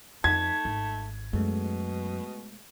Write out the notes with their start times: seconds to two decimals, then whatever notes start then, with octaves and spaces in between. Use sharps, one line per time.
0.24 F2 A3 D#4 G#6 B6
0.65 G#1
1.33 F#2 B2 G#3 A3